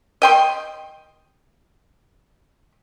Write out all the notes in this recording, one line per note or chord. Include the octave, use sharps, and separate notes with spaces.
D#5 G5 C6